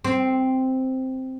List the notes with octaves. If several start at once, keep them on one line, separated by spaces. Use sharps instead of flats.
C4